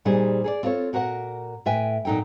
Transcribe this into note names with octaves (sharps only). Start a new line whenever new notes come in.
A#2 G3 D#4 G#4 C5
G#4 A4 D5
C4 F4 A4 A#4 C#5
A#2 F#4 A#4 C5 F#5
A2 B4 E5 G5 G#5
A#2 F#3 D#4 A4 G5